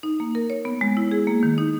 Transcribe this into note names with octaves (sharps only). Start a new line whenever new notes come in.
D#4
A#3
A#4
C#5
B3
G#3
E4
G#4
A#3
D#3
D#4